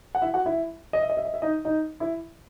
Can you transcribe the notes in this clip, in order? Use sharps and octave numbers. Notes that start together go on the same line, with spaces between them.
F#5
E4 E5
F#4 F#5
E4 E5
D#5
E5
D#5
E5
D#5
E5
D#4 D#5
D#4 D#5
E4 E5